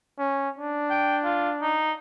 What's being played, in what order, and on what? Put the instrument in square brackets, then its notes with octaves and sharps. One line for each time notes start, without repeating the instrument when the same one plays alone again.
[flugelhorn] C#4
D4
[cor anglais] G5
F4
D#4